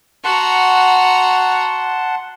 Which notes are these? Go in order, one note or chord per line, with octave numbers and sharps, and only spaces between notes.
F#4 F#5 A5 A#5 C6